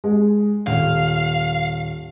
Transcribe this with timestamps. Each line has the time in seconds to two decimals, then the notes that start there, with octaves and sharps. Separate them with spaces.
0.04 G#3
0.67 D#1 F5